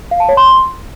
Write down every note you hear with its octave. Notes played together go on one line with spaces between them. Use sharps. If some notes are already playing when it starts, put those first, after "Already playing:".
F5
A5
C#5
C6